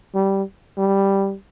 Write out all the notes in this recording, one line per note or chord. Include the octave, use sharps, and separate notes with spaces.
G3
G3